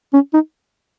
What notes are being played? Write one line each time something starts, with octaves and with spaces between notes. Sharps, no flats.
C#4
D#4